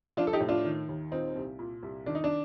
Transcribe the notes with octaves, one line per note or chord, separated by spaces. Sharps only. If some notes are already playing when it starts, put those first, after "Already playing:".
F3 D4 F4
A4
D#4 G4
A2
D4 F4
D#3
D#2
A#2 C4 D#4
C2
A#2
C2
D#3 D4
D#4
D4